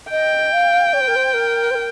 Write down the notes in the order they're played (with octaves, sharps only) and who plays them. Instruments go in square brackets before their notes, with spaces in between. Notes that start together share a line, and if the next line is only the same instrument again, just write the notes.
[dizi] D#5 [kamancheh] G5
[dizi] F5
C#5
C5
A#4
C5
A#4
C5
A#4